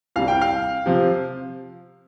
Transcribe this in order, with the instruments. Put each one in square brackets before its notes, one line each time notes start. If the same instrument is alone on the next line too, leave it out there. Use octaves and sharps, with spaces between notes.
[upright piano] C2 C3 G3 F5
G5
F5
C3 F3